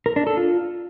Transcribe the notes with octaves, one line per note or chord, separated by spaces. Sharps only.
A#4
D4
A4
F4